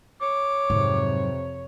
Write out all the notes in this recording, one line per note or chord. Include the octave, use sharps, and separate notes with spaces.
C#5 D6
F2 G#2 C3 F#3